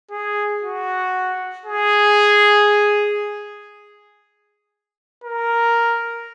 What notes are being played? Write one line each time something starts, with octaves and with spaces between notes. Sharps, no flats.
G#4
F#4
G#4
A#4